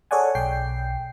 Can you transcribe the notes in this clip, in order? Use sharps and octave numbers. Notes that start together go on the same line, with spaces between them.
G#4 A4 C#5 D5 F#5 G#5
B1 G5 C7